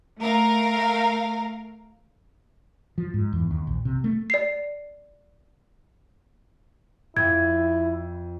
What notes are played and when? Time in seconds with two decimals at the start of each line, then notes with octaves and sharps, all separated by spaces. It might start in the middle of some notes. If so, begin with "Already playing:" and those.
0.20 A3 A#4 F5
2.98 F3
3.14 G#2
3.33 E2
3.51 D#2
3.67 A#1
3.85 C3
4.04 A3
4.30 D5 C7
7.17 F2 E4 G#6